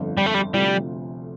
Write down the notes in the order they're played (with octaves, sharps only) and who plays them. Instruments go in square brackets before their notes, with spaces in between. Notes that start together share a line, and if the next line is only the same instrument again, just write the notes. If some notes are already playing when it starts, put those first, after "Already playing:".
Already playing: [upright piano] G1 F2 D3
[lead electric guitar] G3
A3
G3
[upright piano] D2 C3 F3 [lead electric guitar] G3